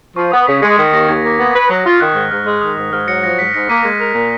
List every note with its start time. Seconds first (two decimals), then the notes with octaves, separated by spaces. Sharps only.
0.16 F3 C#6
0.32 B3 D#6
0.47 C#3 B6
0.62 G#3 A#6 C#7
0.78 D#3 B6
0.93 D#2 A#6
1.08 D#2 G#6
1.24 A#3
1.39 B3
1.55 B4
1.70 F#3
1.85 F4
2.00 D#3 F#6
2.16 G#2 F6
2.31 G#2 F6
2.47 G#3 F6
2.62 D#3 D#6
2.77 G#2 D#6
2.92 G#2 F6
3.07 F#3 A#6 C#7
3.23 F3 A#6 C#7
3.38 G#2 B6
3.54 G#2 A#6 C#7
3.69 A#3 B6 D#7
3.84 G#3
4.00 A#4
4.15 A#2